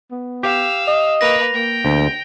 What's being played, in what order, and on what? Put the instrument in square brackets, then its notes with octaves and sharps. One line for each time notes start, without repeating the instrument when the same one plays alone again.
[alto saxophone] B3
[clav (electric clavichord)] G4 [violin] F5 E6
[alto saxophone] D#5
[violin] A#3 B4 [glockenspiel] A#6 F7
[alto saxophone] A#3 [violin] G5
[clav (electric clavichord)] D2